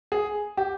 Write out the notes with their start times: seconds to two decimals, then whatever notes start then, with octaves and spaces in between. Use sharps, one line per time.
0.12 G#4
0.57 G4